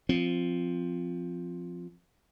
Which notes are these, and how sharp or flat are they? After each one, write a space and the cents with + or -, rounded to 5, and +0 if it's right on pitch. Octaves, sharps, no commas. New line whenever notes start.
F3 +0 C4 +0